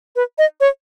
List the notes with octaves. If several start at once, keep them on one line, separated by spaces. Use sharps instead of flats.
B4
D#5
C#5